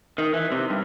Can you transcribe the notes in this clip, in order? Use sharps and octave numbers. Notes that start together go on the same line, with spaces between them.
D#3
E3
C3
G2